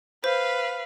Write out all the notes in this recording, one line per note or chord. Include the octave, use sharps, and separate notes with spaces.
B4 C5 F5